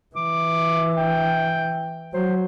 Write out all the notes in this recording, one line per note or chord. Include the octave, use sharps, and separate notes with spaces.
E3 D6
G5
F#3 C5